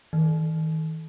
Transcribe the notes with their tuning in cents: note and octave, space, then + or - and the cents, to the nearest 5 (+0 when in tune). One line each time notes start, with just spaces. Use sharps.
D#3 +40